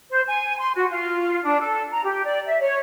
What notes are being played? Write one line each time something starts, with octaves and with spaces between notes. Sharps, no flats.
C5
G#5
C6
F#4
F4
D4
A4
A#5
G4
D5
E5
C#5